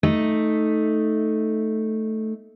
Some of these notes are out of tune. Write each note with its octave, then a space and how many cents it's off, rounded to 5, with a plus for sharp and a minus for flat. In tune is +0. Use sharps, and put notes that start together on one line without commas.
A3 -5 D#4 +0